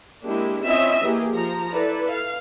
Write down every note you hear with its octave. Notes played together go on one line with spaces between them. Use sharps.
G#3 A#3 D4 E4 G4
C4 C#4 E4 F4 D#5 E5
E3 A#3 G4 G#4
F3 A#5
E4 A4 B4 D5
F5